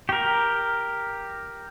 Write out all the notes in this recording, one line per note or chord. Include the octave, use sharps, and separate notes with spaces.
G4 A#4